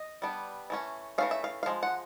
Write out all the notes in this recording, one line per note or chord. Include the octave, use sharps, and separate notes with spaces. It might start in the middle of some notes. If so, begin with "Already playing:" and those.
Already playing: D#5
G3 B3 D4
E3 A3 C#4
E3 A3 C#4 F5
E5
F5
F5
F3 G#3
F#5